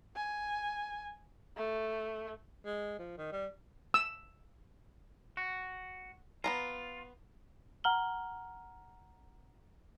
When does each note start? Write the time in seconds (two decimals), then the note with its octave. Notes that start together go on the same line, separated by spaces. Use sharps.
0.16 G#5
1.57 A3
2.65 G#3
2.99 F3
3.18 D#3
3.32 G3
3.94 E6
5.37 F#4
6.44 B3 F4 A5 A#5
7.84 F#5 A#5 F6 F#7 G7